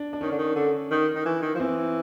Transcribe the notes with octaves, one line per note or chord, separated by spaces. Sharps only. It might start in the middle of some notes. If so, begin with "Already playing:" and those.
Already playing: D4
D4
D#3 C#4
D3
D#3
D3
D#3
D#3
E3
D#3
F3
E3 C4